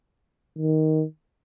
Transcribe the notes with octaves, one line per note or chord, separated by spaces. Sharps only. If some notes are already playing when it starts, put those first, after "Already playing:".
D#3